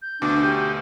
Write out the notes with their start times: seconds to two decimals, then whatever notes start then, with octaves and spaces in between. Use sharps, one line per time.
0.01 G6
0.22 D2 B2 D4 D6
0.41 G4